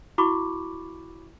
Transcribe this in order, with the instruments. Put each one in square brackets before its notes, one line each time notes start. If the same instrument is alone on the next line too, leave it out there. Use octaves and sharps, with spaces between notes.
[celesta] E4 F#4 B5 C#6 D6